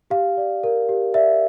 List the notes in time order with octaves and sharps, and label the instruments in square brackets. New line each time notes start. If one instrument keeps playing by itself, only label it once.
[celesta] G4 F5
D5
A#4
G4
D5 E5